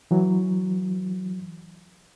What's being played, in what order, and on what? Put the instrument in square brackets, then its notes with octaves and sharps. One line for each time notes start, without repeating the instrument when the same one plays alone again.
[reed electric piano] E3 F#3